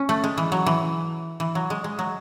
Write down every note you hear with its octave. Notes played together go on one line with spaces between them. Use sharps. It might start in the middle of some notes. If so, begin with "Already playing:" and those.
Already playing: C#4
A3
G#3
E3
F#3
E3
E3
F#3
G#3
G#3
F#3